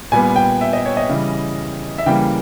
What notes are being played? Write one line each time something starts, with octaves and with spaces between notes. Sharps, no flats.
A#2 G3 B3 G#5
G5
E5
D#5
C#5
D#5
C#3 E3 G3
E5
C#3 E3 G3 A#3 G5